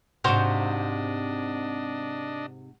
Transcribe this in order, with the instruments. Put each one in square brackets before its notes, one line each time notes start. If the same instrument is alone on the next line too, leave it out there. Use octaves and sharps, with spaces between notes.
[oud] G#2 C3 [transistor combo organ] D4 D#5 [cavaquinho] F#4 C5 F5